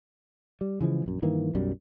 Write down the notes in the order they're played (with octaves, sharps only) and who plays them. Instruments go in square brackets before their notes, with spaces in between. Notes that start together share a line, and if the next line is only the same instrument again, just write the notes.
[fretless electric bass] G3
C#3 E3 F3 G#3
A#1 F#2
G2 D#3 E3 A#3
B1 F#2 G3